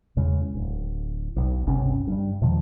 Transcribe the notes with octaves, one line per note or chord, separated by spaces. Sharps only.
E2 C#3 G#3
D1
B1
G1 C#2 C3 C#4
G2 G3
E2 B2 D#3 F3